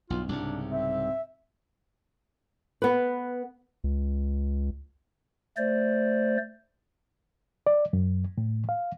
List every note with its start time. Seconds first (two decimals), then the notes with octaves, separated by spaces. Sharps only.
0.10 B1 G2 F4
0.29 C2 G#2 C#3 D4
0.72 C4 E5
2.82 B3 B4
3.84 C#2
5.57 A3 C5 D5
7.67 D5
7.93 F#2
8.38 A2
8.69 F5